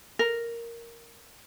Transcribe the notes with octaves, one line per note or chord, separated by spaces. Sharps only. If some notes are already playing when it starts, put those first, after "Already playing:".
A#4